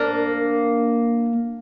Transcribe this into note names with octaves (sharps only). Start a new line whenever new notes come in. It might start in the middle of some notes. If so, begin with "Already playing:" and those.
Already playing: A#3 D4